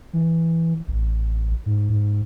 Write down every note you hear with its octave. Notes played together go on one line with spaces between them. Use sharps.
E3
A1
G#2
G#2